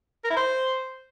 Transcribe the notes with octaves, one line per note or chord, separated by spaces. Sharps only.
A#4
E4
C5